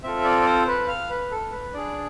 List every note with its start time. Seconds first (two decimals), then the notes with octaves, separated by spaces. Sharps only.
0.03 C4 F4 A4 E5
0.25 D5
0.41 D5
0.46 C5
0.67 B4
0.88 F5
1.10 B4
1.31 A4
1.52 B4
1.74 D4 G#4 D5